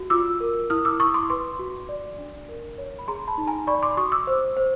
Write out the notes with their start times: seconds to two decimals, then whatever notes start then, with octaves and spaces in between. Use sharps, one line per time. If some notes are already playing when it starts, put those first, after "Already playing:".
Already playing: F#4
0.10 F4 D6 E6
0.40 A#4
0.70 E4 D#6 F6
0.85 D6 E6
1.00 E4 C#6 D#6
1.14 C6 D6
1.30 B4 C6 D6
1.59 F#4
1.89 D5
2.18 D4
2.49 A#4
2.78 C#5
2.99 B5
3.08 G#4 A#5 C6
3.28 A5 B5
3.38 D#4
3.47 G#5 A#5
3.67 D5 B5 C#6
3.83 C6 D6
3.97 F#4 C#6 D#6
4.12 D6 E6
4.27 C5
4.57 C5